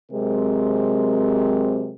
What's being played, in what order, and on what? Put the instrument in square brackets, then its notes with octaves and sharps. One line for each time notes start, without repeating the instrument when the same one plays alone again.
[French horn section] C3 F#3 G#3 C4 A#4